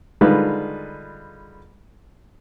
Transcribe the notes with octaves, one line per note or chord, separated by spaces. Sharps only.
D3 D#3 G3 G#3 F4 B4